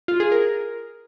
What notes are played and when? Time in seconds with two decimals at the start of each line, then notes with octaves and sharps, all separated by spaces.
0.08 F4
0.20 G#4
0.32 A#4